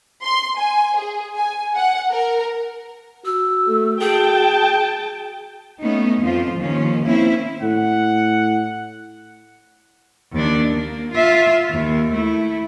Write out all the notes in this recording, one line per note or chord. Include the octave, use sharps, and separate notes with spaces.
C6
G#5
G#4
G#5
F#5
A#4
F#4 E6
A3
G#4 G5 A5
A3 B3 C#4 D#4
F2 F3 F4
D#2 D#3 F3 C#4
A#3 C4 C#4 E4
A2 F#5
D#2 D4
A#3
F4 E5
D#2
A3 E4